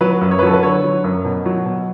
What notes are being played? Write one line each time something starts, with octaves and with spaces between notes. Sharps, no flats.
F#3 B4
F#2
C#5
B4
F#3 A4
B4
D3 C#5
F#3
F#2
B2
F#3
B2